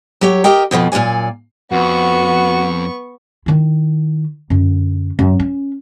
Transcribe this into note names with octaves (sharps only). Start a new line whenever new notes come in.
F#3 G4 C#5
G4 A#4 D#5 G5
F2 B2 E3 F3
F#2 A#2 F#3 D5 G#5
F2 B3 F#4 C#6
D#3 E4
F#2 D3
F#2
C#4